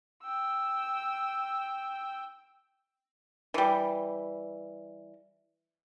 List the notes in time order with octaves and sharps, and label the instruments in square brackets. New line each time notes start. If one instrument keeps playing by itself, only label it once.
[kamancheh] G5 E6
[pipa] E3 G3